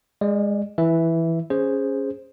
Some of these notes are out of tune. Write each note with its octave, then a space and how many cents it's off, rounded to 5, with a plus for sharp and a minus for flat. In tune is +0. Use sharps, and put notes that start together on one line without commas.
G#3 -15 D5 +15
E3 +0 E5 +0
C#4 +0 G#4 -5 C5 +0